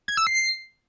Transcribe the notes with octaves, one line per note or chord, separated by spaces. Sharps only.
G#6
E6
C7